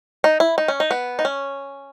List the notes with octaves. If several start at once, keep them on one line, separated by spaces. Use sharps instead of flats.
D#4
E4
D#4
C#4
D#4
B3
D#4
C#4